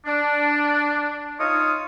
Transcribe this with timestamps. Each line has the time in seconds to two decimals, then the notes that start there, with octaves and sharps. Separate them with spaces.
0.06 D4
1.39 D#4 F4 C#5 D#6